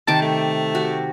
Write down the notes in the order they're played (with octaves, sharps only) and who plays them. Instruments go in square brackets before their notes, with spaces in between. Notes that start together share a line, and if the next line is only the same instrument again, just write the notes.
[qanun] C3 D#3 D6 [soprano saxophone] A5
[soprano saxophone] A3
[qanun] F#4 G4